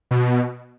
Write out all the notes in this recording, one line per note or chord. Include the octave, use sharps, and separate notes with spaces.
B2